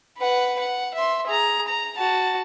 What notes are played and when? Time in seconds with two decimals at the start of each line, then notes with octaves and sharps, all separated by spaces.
0.18 B4 F#5
0.59 F#5
0.95 E5 C6
1.27 G#4 A#5
1.67 A#5
1.98 F#4 A5